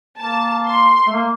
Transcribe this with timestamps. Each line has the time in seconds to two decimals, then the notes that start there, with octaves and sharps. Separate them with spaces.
0.19 A#3 A5
0.66 C6
1.07 A3
1.13 A#3